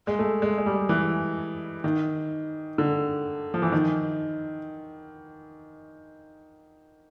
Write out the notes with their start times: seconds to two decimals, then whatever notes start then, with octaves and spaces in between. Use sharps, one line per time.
0.07 G#3
0.19 A3
0.42 G#3
0.58 G#3
0.66 G3
0.89 E3
1.84 D#3
2.78 D3
3.54 F3
3.62 E3
3.72 D#3